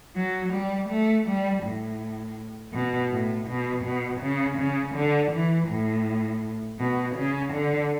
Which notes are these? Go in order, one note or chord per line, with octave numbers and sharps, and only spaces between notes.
F#3
G3
A3
G3
A2
B2
A2
B2
B2
C#3
C#3
D3
E3
A2
B2
C#3
D3